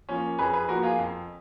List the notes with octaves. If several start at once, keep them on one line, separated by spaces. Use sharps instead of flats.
F3 A#3 C#4
F2 G#4 B4
G#4 B4
F3 A#3 F#4 A#4
F4 G#4
F2